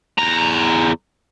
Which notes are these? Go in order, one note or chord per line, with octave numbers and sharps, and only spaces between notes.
E2 A#5